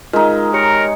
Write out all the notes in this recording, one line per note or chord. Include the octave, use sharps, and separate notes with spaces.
G#3 D#4 F4 A#4 F6
G4 A#4 C#5 C#7